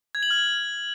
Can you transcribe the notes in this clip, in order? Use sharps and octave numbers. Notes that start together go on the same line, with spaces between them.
G#6
F#7
F6